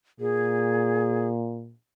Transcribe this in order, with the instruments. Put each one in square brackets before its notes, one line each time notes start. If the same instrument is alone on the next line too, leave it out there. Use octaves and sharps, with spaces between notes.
[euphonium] A#2 [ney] G#4